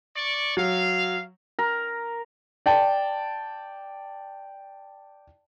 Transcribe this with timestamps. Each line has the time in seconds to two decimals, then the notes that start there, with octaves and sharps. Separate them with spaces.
0.16 D5 C#6
0.57 F#3 F5
1.59 A#4
2.66 D5 G5 A5